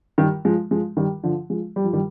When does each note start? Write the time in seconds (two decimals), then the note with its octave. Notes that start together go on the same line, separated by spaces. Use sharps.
0.18 D#3 G3
0.45 F3 G#3
0.71 F3 G#3
0.97 D#3 G3
1.23 D3 F3
1.50 F3 G#3
1.76 G3
1.84 F3
1.93 D#3 G3